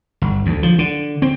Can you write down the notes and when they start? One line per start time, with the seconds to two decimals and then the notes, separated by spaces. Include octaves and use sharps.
0.22 G1
0.46 D2
0.63 F3
0.79 D3
1.22 C4